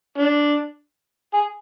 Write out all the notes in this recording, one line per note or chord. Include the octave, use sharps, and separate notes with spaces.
D4
G#4